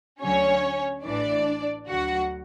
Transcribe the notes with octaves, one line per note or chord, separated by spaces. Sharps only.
D2 D3 F#3 C#4 C#5
A1 A2 E3 D4 D5
D2 D3 F#3 F#4 F#5